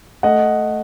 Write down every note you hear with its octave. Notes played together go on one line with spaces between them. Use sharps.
A3 D#5 F#5